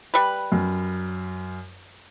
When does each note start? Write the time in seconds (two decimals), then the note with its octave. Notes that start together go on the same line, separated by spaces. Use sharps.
0.14 G3 B4
0.52 F#2